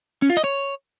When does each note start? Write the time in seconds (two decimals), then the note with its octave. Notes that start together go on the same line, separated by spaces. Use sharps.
0.22 C#4
0.29 F4
0.37 D#5
0.44 C#5